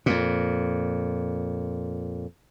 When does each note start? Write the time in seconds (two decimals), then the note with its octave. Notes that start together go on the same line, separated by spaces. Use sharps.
0.06 F2 A#2